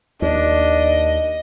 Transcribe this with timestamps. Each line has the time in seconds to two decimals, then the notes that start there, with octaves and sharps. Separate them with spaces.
0.22 D#2 D4 D#5